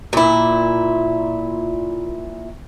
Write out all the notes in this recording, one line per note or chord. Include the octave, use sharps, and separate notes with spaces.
A#2 E4